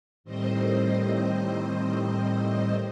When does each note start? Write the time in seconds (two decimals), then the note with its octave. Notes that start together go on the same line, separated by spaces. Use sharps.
0.24 A2 D#3 G3 C4 C5 D#5